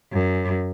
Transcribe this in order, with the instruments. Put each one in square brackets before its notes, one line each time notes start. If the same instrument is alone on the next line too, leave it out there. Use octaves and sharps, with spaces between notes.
[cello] F#2